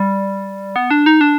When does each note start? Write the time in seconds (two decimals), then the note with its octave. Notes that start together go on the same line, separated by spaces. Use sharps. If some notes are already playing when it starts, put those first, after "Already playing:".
Already playing: G3
0.76 B3
0.91 D4
1.06 D#4
1.21 D4